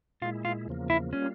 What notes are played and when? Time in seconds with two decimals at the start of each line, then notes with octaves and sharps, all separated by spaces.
0.22 A#2 G#3 E4 F4
0.45 F4
0.68 E2 C#3 F3 A#3
0.90 E4
1.13 G3 A#3 C#4 F4